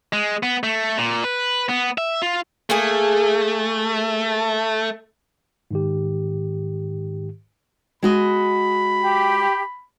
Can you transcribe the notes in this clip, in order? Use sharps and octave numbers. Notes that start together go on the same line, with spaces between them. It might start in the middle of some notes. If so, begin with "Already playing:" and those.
G#3
B3
A3
A#2
B4
B3
E5
F4
A3 A#3 G#4
G#2 D#3 G4
G#3 F#4 D#5 B5
G4